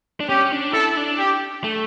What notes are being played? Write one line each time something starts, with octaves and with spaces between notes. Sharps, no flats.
D4
C#4 G4
D4
E4 A4
D4
G4
A3